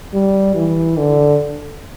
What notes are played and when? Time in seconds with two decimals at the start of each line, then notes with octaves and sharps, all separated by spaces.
0.14 G3
0.55 E3
0.98 D3